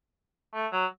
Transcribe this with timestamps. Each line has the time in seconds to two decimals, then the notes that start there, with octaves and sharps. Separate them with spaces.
0.54 A3
0.72 F#3